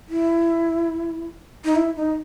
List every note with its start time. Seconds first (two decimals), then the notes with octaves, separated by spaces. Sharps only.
0.09 E4
1.65 D#4
1.76 E4
1.96 D#4